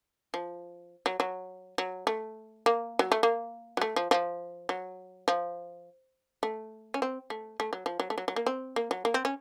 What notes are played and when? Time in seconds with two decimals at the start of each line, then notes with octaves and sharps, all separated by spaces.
0.34 F3
1.06 F#3
1.20 F#3
1.78 F#3
2.07 A3
2.66 A#3
2.99 F#3
3.12 A3
3.23 A#3
3.77 F#3
3.81 A3
3.96 F3
4.11 F3
4.69 F#3
5.28 F3
6.43 A3
6.94 C#4
7.02 C4
7.30 A3
7.60 A3
7.73 F#3
7.86 F3
8.00 F#3
8.10 A3
8.18 F#3
8.28 F#3
8.36 A#3
8.46 C4
8.76 A#3
8.91 F#3
9.05 A#3
9.14 C4
9.25 C#4